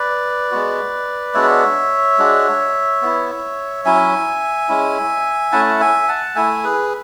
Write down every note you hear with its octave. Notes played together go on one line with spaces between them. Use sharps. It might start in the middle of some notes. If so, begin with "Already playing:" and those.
Already playing: B4 D5
G#3 B3 F#4
G#3 B3 D4 F#4 C#5 E5
G#3 D4 F#4
B3 E4
F#3 C#4 E4 E5 G#5
G#3 C#4 E4
A3 C#4 E4 F#5 A5
E5 G#5
F#5 A5
A3 E4 E5 G#5
G#4 B4